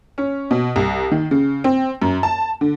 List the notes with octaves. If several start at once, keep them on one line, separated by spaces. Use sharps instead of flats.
C#4
B2
C2
D#3
C#3
C4
F#2
A5
D3